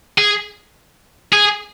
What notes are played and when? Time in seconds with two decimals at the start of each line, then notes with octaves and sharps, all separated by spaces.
0.18 G#4
1.33 G#4